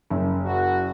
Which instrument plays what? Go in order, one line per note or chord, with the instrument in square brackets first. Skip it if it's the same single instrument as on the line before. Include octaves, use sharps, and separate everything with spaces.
[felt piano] F#1
[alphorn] F#4